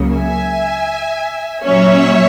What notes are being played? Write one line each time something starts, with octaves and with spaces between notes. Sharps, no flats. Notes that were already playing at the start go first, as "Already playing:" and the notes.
Already playing: C#2 C#3 F#3 A#3
E5 G#5
A#2 F#3 C#4 C#5 E5